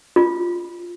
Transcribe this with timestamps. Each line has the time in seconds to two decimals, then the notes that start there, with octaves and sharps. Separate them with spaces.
0.16 F4